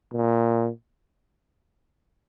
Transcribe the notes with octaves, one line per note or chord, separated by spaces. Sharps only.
A#2